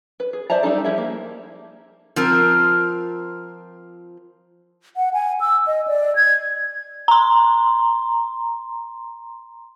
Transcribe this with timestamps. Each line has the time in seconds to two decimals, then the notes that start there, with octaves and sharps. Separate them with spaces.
0.20 B4
0.33 G#4
0.50 C5 D5 E5 A5 A#5
0.63 G3 D4 D#4 A4
0.84 F3 G3 E4 G#4 E5
0.98 A#3
2.16 F3 C4 A#4
4.97 F#5
5.13 G#5
5.40 E6
5.67 D#5
5.88 D5
6.16 G#6
7.08 A#5 C6